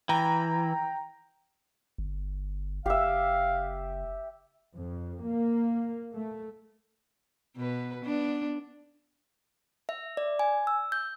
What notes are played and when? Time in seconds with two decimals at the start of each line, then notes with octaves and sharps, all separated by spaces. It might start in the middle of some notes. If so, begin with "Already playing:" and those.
0.09 E3 G5 A#5
1.98 G1
2.86 F#1 G4 E5 F5
4.75 F2
5.28 A#3
6.13 A3
7.57 B2 B4
8.05 B3 D4
9.89 E5
10.17 D5
10.39 G#5
10.67 E6
10.92 G6